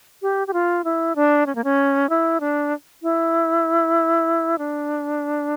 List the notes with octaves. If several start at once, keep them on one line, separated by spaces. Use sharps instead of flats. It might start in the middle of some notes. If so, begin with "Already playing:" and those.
G4
G4
F4
E4
D4
C#4
A#3
C#4
E4
D4
E4
D4